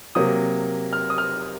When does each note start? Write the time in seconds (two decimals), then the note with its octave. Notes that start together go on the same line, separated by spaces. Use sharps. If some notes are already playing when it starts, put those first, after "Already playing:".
0.15 C3 F#3 A#3 D#6
0.93 F6
1.10 D#6
1.18 F6